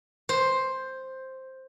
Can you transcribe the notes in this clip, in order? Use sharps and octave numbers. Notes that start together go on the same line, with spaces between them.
C5